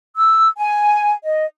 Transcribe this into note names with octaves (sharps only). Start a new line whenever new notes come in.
E6
G#5
D#5